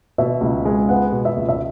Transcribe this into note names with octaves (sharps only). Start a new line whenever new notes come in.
B2 E5
C#2
G#3
B3 F#5
B2
E5
C#2
E5